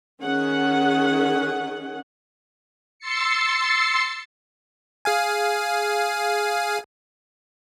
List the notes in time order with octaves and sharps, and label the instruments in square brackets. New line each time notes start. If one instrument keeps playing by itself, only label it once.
[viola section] D#3 C#4 G#4 F#5
[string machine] C6 E6 A6 C7 C#7
[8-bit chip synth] G#4 F5 G#5